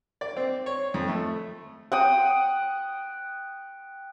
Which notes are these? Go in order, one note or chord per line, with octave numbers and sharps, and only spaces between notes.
D5
C4
C#5
F2
A3
F#5 G5 D#6